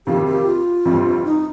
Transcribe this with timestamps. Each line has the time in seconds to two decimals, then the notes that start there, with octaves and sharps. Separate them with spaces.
0.06 F2 C3 D#3 A#3 F4 G4
0.26 G4
0.46 F4
0.85 G1 F2 C3 G3
1.25 D#4